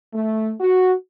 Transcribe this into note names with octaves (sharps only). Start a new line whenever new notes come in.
A3
F#4